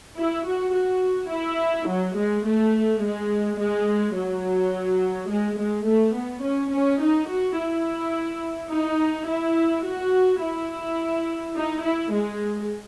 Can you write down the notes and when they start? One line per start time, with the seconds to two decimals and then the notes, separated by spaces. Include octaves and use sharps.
0.17 E4
0.45 F#4
0.73 F#4
1.30 E4
1.87 F#3
2.16 G#3
2.45 A3
3.01 G#3
3.59 G#3
4.15 F#3
5.29 G#3
5.58 G#3
5.86 A3
6.14 B3
6.43 C#4
6.71 C#4
7.00 D#4
7.28 F#4
7.57 E4
8.70 D#4
9.28 E4
9.84 F#4
10.41 E4
11.55 D#4
11.84 E4
12.12 G#3